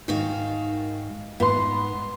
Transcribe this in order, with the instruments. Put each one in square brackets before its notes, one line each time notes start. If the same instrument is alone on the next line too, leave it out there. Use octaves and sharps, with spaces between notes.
[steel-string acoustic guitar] G#2 F#4 F5 [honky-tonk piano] D#3
[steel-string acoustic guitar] G#2 [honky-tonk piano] B3 C6